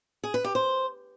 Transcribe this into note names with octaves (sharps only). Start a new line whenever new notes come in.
G#4
B4
G4
C5